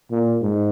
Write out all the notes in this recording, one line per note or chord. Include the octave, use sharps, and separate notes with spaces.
A#2
G#2